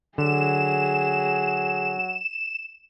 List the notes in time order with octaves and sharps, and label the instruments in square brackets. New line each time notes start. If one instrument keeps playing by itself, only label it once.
[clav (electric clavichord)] D3 [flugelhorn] F#3 [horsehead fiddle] G#4 [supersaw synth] E7